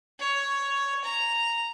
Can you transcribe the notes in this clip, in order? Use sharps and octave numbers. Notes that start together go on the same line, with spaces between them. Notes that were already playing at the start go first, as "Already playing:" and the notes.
C#5
A#5